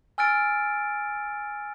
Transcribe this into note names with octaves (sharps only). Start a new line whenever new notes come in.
G#5 E6 F6 A6 D7